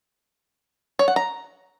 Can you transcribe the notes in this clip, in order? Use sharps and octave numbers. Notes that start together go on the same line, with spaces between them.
C#5
F#5
A#5